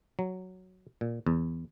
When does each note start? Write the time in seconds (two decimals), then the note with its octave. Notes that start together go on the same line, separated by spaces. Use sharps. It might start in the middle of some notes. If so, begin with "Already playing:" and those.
0.19 F#3
1.01 A#2
1.27 E2